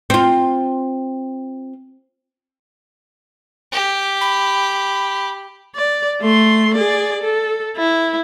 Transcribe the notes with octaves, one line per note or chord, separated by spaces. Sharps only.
C4 F4
G4
B5
D5
A3 C6
G#4 D5
A4
E4